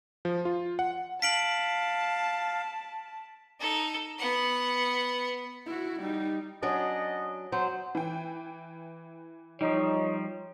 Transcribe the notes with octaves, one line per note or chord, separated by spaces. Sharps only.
F3
F4
F#5
F5 A5 B6 D7 F#7
D#4 A4
B3 F#5
E4 F#4
G3 D#4
F#3 C#4 D4 D#5
F#3 C5
E3 G5
F3 G3 D#4 C#5